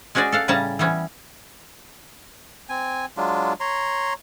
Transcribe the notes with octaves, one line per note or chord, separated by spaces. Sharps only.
G#3 C#4 F#4 G#4 D5
A4 F5 F#5
A2 C#3 G3 C#4 A5 A#5
E3 G3 B3 C#4
C4 G#5
F#3 G#3 D4 F4
C#5 A#5 C6